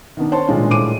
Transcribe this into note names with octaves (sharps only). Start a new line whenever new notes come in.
D#3 B3 D4
C5 C#5 A5 C6
D#1 A#2 G#3 D4 F4
A2 D6 D#7